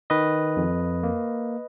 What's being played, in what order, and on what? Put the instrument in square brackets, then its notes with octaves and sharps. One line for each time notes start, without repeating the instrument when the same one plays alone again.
[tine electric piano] D#3 B4 D#5
F2
A#3